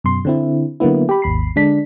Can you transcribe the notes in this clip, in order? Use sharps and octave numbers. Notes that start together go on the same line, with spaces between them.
F#2 B2 C6
D3 C4 E4
D3 F#3 A#3 B3 E4
G4 B5
G#1 D#2 B5 C7
D3 G#3 D4 B6